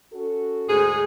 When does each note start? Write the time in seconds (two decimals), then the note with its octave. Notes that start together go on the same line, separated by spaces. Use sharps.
0.13 C#4 F#4 A4
0.69 D2 G#2 G#4